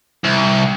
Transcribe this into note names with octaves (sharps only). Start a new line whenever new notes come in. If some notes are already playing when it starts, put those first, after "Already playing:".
C2